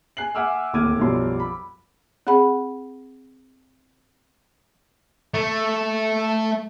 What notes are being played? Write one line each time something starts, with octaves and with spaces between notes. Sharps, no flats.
G#5 F#6 C7 F#7
E5 F#5 G#5 D6 E6 F6
D1 D#2 D6 F6 G#6 D#7
B1 F#2 F3 G3 C6
B5
C4 G#4 F#5 B5
A3